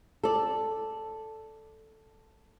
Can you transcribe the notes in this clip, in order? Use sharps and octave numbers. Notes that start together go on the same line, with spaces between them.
A4 D5